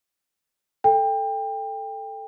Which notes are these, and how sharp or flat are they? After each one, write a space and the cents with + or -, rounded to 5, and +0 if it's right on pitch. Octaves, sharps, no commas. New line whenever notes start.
A4 +0 G5 +25